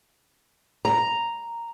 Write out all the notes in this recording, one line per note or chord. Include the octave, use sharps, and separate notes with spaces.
A#5